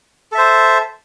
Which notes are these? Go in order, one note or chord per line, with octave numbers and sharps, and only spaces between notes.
A4 C5 E5